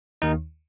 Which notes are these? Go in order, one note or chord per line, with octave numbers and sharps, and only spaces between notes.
D#2 D#3 D#4